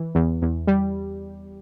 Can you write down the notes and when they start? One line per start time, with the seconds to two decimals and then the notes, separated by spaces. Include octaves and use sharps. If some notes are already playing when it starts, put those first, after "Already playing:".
Already playing: E3
0.15 E2
0.42 E2
0.67 G3